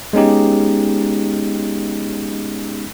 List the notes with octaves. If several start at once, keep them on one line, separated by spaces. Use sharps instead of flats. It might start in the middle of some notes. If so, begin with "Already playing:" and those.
G#3 B3 C#4 D#4 G4